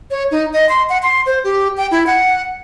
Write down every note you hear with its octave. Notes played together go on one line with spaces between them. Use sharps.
C#5
D#4
D#5
C6
F#5
C6
C5
G4
G5
E4
F#5